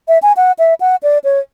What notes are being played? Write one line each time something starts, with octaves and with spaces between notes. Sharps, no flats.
E5
G#5
F#5
E5
F#5
D5
C#5